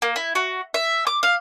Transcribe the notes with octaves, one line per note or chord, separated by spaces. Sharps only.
A#3
E4
F#4
E5
D6
F5